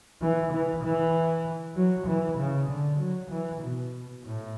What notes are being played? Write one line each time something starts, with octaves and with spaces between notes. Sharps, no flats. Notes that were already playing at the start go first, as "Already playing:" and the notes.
E3
E3
E3
F#3
E3
C#3
D3
F#3
E3
B2
A2